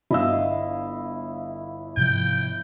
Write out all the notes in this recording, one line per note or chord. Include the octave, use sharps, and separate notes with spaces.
G1 E4 D#5 F5 E6
G#2 C3 F3 G5